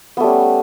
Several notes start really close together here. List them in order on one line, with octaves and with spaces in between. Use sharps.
B3 A3 G3 C#4